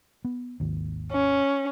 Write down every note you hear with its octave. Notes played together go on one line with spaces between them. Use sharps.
B3
G#1 D#2
C#4